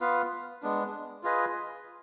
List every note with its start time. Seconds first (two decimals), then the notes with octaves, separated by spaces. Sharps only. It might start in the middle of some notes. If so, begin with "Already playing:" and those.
0.01 B3 F4 B4 F5
0.62 G#3 B3 D4
1.23 F4 G#4 B4 D#5